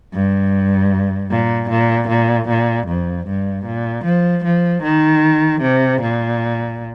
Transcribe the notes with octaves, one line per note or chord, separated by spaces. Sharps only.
G2
A#2
A#2
A#2
A#2
F2
G2
A#2
F3
F3
D#3
C3
A#2